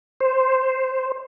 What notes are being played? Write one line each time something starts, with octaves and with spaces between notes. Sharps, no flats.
C5